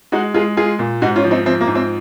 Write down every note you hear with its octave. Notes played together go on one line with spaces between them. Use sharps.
G#3 D#4 F#4
G#3 F4 G#4
G#3 F4 G#4
A#2
G#2 D#4 F#4
C#4 F4
F3
C4 D#4
F3 C4
A#3
G#2
C4